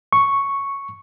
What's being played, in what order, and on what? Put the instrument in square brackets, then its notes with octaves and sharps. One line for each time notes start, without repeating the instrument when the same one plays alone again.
[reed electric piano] C#6